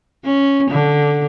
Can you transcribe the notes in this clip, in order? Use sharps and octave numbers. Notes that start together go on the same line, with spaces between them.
C#4
D3